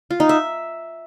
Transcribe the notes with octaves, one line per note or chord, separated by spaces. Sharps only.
F4
D#4
E5